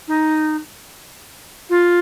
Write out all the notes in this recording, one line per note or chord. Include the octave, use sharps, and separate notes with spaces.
D#4
F4